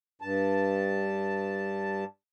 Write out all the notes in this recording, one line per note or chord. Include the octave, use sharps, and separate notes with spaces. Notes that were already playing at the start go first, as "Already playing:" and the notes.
G2 A5